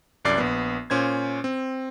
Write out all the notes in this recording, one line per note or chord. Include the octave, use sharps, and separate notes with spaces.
C2 F#2 D5 C7
A#1 B3
A#2 C#4 C5 G#6
C4